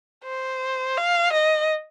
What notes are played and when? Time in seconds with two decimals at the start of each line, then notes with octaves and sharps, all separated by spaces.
0.25 C5
0.97 F5
1.33 D#5